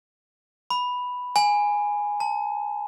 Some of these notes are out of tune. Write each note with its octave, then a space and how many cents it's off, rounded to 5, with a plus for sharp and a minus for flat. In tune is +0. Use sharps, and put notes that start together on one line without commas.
B5 +0
G#5 -5
A5 +20